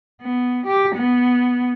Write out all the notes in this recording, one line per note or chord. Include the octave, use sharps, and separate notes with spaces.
B3
G4
B3